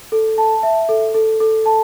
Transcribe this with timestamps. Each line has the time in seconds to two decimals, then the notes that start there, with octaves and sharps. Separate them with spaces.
0.12 A4
0.38 A5
0.63 E5
0.89 A4
1.14 A4
1.40 A4
1.66 A5